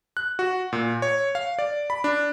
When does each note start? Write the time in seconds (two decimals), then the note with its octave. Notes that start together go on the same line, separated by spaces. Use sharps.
0.17 F#6
0.39 F#4
0.73 A#2
1.02 C#5
1.35 F5
1.59 D5
1.90 B5
2.04 D4